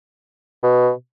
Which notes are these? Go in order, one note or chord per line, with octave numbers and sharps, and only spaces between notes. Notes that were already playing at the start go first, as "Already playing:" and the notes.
B2